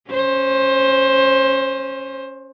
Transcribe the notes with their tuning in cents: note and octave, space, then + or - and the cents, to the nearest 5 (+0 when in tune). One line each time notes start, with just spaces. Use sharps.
C#4 -10 C5 +15